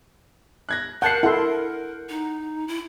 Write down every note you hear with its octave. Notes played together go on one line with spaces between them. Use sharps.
F#6 G#6 A#6
A#4 F#5 A5 G6 C7
E4 A4 F#5 C6
D#4
E4